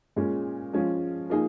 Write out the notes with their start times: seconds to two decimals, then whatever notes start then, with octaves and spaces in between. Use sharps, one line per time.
0.16 A#2 G#3 C#4 G#4
0.73 F3 G#3 C#4 F4
1.30 F3 A#3 D#4 G#4